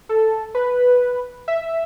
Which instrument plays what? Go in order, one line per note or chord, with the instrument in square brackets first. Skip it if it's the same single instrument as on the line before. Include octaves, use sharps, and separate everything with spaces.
[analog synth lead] A4
B4
E5